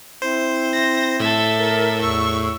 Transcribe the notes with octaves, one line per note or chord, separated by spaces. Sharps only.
C4 E4 C5
A#6
A2 A4 E5
A#4
E2 C#6 E6